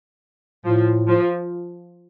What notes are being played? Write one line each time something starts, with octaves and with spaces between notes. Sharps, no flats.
A2 F3
F3